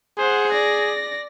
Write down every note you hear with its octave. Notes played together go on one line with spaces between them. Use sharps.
G#4 C5 F#5
D5 A#6